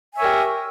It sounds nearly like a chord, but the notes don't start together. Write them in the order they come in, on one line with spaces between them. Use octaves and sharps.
G#5 C#5 E5 A#4 G4